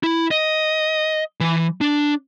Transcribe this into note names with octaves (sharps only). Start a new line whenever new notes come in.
E4
D#5
E3
D4